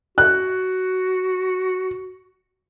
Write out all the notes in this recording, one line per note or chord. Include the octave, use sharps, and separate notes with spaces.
F#4 F#6